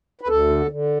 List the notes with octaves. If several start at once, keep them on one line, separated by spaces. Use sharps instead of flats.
B4
D2 A4
D3
D3